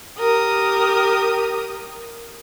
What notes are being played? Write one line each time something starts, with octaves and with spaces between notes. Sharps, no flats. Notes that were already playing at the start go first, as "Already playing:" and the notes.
G4 A#4 D#6